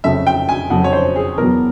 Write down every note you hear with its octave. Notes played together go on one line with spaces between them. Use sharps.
F2 C#3 F#3 A3 E5
G5
G#5
F2 C#3 F#3 A3 F#5
C#5
C5
G#4
E2 B2 F#3 B3 A#4